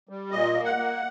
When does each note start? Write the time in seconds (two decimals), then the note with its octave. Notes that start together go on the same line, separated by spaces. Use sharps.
0.09 G3
0.31 A#2 D#5
0.54 A#3
0.65 F#5
0.76 A#3